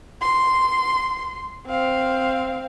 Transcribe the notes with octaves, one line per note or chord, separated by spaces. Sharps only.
C6
C4 F5